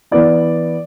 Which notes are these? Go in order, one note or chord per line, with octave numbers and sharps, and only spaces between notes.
E3 B3 E4 D5